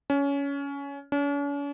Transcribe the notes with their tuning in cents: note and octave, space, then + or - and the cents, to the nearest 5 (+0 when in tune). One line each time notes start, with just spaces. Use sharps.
C#4 +20
C#4 +45